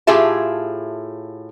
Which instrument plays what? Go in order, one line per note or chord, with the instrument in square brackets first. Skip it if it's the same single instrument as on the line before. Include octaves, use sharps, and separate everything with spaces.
[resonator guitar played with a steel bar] A2 F4 G4 G#4 E5 A5